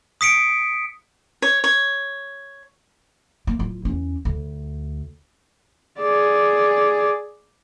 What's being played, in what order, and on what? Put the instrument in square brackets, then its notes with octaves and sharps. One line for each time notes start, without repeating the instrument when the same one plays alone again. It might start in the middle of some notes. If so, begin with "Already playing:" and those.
[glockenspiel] D#6 B6 C#7 D7
[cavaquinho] C#5
C#5
[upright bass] A#3
D1 F4
E2 C#4
D2
[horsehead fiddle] G#4 D5